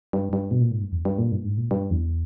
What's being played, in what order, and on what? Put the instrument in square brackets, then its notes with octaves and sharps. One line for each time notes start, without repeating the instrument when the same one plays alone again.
[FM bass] G2
G2
B2
A#2
G#2
G2
E2
G2
A#2
G2
G#2
A#2
G2
E2